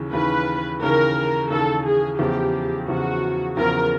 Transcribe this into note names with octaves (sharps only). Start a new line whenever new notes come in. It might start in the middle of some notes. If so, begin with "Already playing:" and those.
Already playing: D#2 C#3 E3
D#2 C#3 E3 B4
D#2 C#3 E3 A#4
D#2 C#3 E3 A4
G#4
E2 C#3 F3 G4
E2 C#3 F3 F#4
E2 C#3 F3 A#4